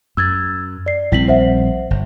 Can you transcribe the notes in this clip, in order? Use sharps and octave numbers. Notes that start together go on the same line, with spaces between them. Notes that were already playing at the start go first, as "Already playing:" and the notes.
F#2 E6 G#6 A6
D5 C7
A#1 G3 C4 E4 B6 F#7
C5 E5 F#5
G1